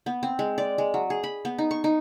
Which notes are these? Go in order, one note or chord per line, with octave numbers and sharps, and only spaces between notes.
B3
C4
G#3
D5
G#3
F#3
G#4
B5
B3
D#4
C#6
D#4